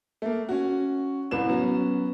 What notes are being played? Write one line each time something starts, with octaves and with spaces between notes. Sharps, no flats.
A3 A#3
C#4 F#4
C2 A2 B4 E7
F#3 B3 C#4